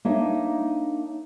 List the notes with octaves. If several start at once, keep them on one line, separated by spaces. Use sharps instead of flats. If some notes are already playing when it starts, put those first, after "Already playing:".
A#3 D4 D#4 C#5 E5